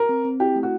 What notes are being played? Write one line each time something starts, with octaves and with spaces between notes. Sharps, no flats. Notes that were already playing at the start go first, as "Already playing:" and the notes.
Already playing: A#4
C4
C4
E4 G4
A3
F#4